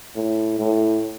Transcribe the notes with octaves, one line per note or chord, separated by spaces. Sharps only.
A2
A2